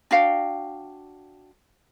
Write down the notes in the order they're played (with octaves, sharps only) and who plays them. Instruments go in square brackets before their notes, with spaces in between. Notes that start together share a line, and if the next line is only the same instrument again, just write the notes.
[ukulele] D4 F#4 F5 G5